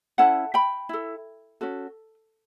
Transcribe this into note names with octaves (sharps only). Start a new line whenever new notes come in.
C#4 E4 A4 F#5 A5
G5 B5
E4 A4
C#4 F#4 A4